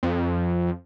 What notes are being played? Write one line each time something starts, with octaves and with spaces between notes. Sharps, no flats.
F2